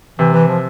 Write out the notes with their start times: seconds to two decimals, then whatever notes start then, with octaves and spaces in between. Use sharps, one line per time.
0.19 C3 E3
0.34 E3
0.48 F3